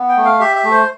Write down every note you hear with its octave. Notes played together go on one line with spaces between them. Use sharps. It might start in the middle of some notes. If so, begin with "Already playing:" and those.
Already playing: B3
G5
A3
F5
G4 E5
E5
A3
C5